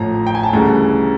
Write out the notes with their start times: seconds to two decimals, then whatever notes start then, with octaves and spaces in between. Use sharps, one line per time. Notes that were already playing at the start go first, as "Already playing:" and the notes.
Already playing: A1 A2 F3 A#5
0.27 G5
0.35 G#5
0.43 A5
0.53 D2 C#3 E3 G3 A#5